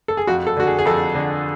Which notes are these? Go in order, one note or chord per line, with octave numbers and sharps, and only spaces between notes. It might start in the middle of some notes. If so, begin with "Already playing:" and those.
A4
G#4
F2 F#4
A4
D3 F#4
G#4
G#4
F2 A4
D3